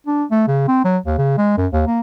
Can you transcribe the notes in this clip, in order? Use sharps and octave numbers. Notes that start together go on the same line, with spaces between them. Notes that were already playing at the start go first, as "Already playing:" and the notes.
D4
A3
C#3
C4
F#3
D#2
C#3
G#3
F#2
D#2
A#3